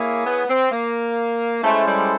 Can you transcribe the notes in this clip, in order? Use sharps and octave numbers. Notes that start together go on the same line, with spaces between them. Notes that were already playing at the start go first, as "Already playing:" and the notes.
Already playing: A#3 E4 G#4 C#5 E5 G#5
B3
C4
A#3
G#3 A3 C#4 E4 A4 C5
G3